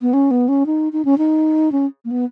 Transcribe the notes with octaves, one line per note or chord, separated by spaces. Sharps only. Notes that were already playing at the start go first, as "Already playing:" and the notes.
B3
C#4
B3
C#4
D#4
D#4
C#4
D#4
C#4
A#3
B3